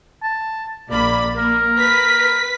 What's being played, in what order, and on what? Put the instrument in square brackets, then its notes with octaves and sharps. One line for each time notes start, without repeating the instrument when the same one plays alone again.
[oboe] A5
[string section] A#1 A#3 B5 [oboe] D5
[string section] A#3 [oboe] A#4
[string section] B4 B6